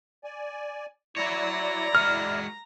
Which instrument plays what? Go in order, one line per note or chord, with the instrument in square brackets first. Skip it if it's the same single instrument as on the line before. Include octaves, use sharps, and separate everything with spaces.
[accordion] D5 G#5
[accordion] E4 D5 [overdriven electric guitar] F#4 C#5 [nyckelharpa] A#5
[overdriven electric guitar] G#3 F#4 [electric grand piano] F6